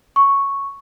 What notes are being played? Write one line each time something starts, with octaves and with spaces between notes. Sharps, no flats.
C#6